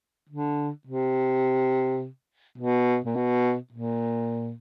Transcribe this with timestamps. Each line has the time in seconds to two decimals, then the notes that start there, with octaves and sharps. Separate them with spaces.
0.29 D3
0.87 C3
2.58 B2
3.05 A#2
3.16 B2
3.72 A#2